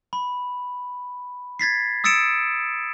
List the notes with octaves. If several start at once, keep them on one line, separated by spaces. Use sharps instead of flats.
B5
G#6 A6 B6 C7
D#6 E6 A6 C#7 D7 E7